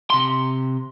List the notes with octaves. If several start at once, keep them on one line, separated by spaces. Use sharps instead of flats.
C3 C6